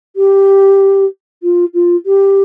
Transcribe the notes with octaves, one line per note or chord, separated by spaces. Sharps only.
G4
F4
F4
G4